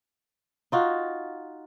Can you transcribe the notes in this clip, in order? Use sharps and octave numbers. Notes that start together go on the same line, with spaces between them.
D#4 F4 F#4